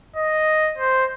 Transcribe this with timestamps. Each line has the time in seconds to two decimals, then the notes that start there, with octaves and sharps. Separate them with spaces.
0.16 D#5
0.78 C5